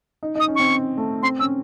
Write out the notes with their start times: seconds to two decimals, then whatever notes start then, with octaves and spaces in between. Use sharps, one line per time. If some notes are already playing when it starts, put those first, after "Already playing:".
0.23 D#4
0.35 D#4 D#6
0.48 C#4
0.55 C4 C#6
0.97 A3
1.23 C4 C6
1.39 C#4 E6